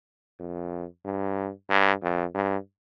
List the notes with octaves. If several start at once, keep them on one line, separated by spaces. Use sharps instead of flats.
F2
G2
G2
F2
G2